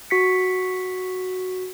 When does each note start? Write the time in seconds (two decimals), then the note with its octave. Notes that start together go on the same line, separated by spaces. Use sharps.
0.10 F#4 B6 C#7